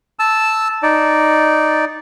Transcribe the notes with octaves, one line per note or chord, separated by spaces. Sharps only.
A5 E6
D#4 D5